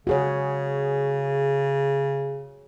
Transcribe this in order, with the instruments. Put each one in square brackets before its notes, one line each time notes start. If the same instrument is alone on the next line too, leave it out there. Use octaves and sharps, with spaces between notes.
[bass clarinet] C#3 [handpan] F#4 G#4 C#5